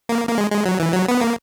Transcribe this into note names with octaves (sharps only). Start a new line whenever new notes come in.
A#3
A#3
G#3
G#3
F#3
E3
F#3
B3
A#3